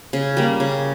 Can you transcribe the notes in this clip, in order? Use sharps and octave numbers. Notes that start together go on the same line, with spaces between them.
C#3
G3 A#3
C#3